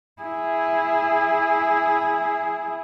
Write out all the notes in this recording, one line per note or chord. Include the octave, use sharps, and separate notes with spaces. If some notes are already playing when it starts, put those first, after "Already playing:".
E4 G#4